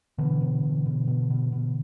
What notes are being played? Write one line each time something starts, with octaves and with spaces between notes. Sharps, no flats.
B2 D3 E3
B2
B2
B2
B2
B2
B2